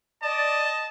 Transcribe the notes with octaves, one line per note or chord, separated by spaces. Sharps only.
D5 D#5 A5